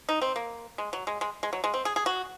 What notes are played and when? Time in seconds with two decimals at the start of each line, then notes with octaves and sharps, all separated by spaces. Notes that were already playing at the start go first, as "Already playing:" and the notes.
0.09 D#4
0.22 C4
0.36 A#3
0.78 G#3
0.93 F#3
1.07 G#3
1.21 G#3
1.43 G#3
1.53 F#3
1.64 G#3
1.74 C4
1.85 G#4
1.96 G#4
2.06 F#4